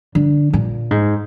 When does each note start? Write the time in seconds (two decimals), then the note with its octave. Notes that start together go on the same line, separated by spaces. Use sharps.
0.15 D3
0.53 A#2
0.91 G#2